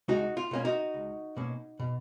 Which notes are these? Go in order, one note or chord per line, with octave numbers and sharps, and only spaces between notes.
C#2 D#4 F#4
F4
B2 A#3 C#4
D#4 F#4
C#2
B2 A#3 C#4
B2